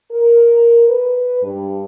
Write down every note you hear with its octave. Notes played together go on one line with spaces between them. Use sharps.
A#4
B4
G2